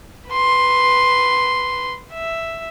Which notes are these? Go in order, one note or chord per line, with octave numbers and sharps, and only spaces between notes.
B4 C6
E5